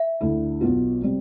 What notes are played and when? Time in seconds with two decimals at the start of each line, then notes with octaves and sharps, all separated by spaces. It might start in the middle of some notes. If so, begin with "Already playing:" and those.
Already playing: E5
0.21 D2 D3 A3 E4
0.61 B1 B2 B3 F4
1.02 C3 G3 C4